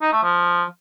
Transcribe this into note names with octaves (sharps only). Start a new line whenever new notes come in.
D#4
A3
F3